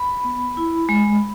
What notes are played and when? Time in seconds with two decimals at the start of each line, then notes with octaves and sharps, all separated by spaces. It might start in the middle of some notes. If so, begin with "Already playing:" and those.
Already playing: B5
0.24 B3
0.57 E4
0.89 G#3